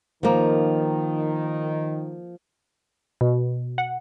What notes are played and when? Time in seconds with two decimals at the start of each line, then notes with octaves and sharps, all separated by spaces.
0.23 D#3 F3 A#3
3.21 B2
3.78 F#5